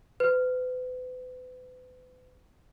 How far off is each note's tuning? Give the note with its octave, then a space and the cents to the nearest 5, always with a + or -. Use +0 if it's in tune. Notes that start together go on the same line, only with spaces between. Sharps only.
B4 +40